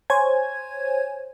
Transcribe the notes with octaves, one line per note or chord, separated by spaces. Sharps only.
C5 C#5 G#5 G#6